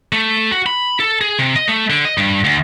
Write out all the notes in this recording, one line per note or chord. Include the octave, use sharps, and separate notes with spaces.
A3
F#4
B5
A4
G#4
C3
D#5
A3
D3
D#5
G2
D2